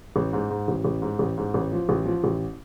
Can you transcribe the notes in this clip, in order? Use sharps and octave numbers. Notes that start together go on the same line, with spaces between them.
A1
G#2
G#2
A1
A1
G#2
A1
G#2
A1
F3
A1
F3
A1